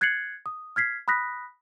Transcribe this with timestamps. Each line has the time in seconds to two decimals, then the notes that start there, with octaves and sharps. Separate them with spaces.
0.01 F#6 G#6 A6 C7 C#7 F#7
0.46 D#6
0.76 F6 G#6 B6 C7
1.08 B5 D#6 F#6 A#6 B6